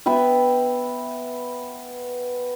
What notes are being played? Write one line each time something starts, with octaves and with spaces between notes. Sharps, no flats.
B3 B4 E5 G5